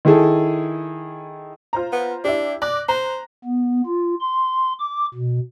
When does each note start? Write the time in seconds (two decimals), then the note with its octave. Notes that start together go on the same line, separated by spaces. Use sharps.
0.05 D#3 E4 G#4 A4
1.73 F4 C5 A#5
1.93 B3
2.24 D4 E4 G4
2.62 D5 D6 F#6 A#6
2.88 C5 A#5
3.45 B3
3.86 F4
4.20 C6
4.80 D6
5.14 B2